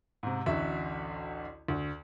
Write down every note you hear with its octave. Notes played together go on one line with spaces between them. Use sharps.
G#2 C3
A1 D2 F#4 E5
D2